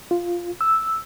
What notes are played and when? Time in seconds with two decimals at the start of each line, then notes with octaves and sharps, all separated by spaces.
0.11 F4
0.61 E6